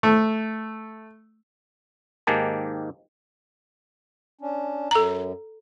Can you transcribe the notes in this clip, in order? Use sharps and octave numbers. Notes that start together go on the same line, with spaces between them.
A3
G#2 D#3 A#3 G4 G#5 A5
C#4 D4
F#2 A4 A#5